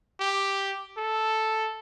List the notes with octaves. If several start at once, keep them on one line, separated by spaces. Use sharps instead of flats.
G4
A4